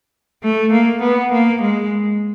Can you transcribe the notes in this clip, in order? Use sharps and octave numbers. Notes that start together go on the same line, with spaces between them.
A3
A#3
B3
A#3
G#3